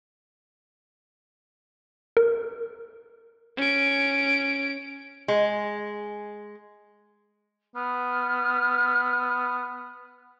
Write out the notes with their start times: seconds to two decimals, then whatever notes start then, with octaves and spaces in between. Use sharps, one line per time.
2.17 A#4
3.57 C#4 D7
5.28 G#3
7.76 B3 F6